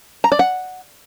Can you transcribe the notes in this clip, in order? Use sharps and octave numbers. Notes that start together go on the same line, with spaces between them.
A#5
D5
F#5